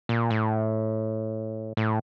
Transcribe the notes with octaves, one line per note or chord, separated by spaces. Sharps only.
A#2
A2
A2